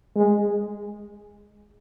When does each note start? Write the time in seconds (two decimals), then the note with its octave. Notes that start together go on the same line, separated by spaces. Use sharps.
0.15 G#3